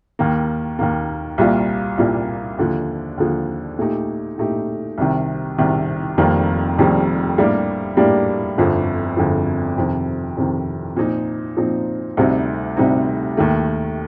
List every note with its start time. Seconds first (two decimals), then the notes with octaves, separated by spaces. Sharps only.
0.19 D#2 D#3 A#3
0.79 D#2 D#3 A#3
1.38 C2 A#2 G3 A#3 F4
1.98 C2 A#2 G3 A#3 F4
2.59 D#2 D3 F3
3.18 D#2 D3 F3
3.79 A#2 A3 D#4 G4
4.38 A#2 A3 D#4 G4
4.98 C2 C3 D#3
5.58 C2 C3 D#3
6.17 F1 F2 D#3 G3 A#3
6.77 F1 F2 D#3 G3 A#3
7.38 A2 G3 A#3 D4 G4
7.97 A2 G3 A#3 D4 G4
8.58 G1 F2 D3 F3
9.17 G1 F2 D3 F3
9.78 F2 C3 D#3
10.37 F2 C3 D#3
10.97 A#2 F3 C4 D#4
11.57 A#2 F3 C4 D#4
12.17 D2 C3 G3 C4 D#4
12.77 D2 C3 G3 C4 D#4
13.37 D#2 D#3 A3